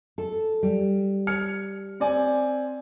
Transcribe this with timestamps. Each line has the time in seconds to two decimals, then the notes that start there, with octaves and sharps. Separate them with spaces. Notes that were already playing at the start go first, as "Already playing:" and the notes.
0.18 A4
0.63 G3
1.27 F6 G#6 C#7
2.00 C4 D5 G#5